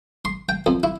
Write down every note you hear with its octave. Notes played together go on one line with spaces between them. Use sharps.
C6
G5
F2
E4